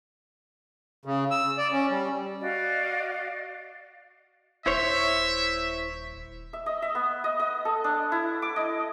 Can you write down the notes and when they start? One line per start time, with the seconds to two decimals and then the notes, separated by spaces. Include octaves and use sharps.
1.05 C#3
1.31 E6
1.58 D5
1.72 C#4
1.89 G3
2.40 F#4 D5 D#5 F5
4.66 D#1 E4 C5 C#5 E5
6.53 E5
6.66 D#5
6.82 E5
6.95 B3
7.24 D#5
7.40 D#5
7.65 A4
7.84 D4
8.12 E4
8.42 D6
8.56 D#5